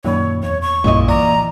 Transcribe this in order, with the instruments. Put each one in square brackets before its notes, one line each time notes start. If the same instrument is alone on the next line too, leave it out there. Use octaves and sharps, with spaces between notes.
[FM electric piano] F#2 A#2 D#3 [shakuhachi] C#5
[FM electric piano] E2 [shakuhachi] C#5
[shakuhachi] C#6
[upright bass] A#1 F#2 [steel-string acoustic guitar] A#2 E4 D#5
[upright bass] E3 [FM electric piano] D5 [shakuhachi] A#5